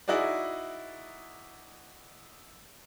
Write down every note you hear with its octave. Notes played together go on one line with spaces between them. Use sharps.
D#4 E4 F#4 G#4 D5